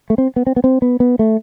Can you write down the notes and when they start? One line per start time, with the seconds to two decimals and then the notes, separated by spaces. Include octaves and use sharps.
0.10 A3
0.18 C4
0.36 B3
0.47 C4
0.56 B3
0.64 C4
0.82 B3
1.00 B3
1.19 A3